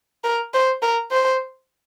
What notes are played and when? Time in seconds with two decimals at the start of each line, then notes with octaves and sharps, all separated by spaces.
0.24 A#4
0.54 C5
0.82 A#4
1.11 C5